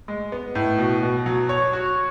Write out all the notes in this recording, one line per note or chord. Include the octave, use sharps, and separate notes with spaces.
G#3
B3
A2
B2
B2
F#3
C#5
F#4